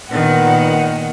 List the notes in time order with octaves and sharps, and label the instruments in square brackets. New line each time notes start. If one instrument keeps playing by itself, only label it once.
[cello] A#2 [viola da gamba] D#3 [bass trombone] B3 [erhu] F#5